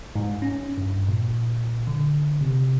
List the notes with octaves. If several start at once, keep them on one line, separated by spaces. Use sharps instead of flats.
G#2
C#4
G2
A#2
D3
C3